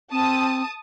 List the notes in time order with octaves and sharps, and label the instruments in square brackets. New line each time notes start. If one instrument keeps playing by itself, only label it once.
[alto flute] C4 [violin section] A5 D#6